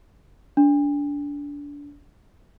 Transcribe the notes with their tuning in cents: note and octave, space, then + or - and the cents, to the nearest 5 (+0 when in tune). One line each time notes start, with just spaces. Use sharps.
D4 -25